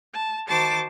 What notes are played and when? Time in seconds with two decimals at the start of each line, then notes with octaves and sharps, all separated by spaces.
0.13 A5
0.49 D#3 F#4 C5 A5 D6 A6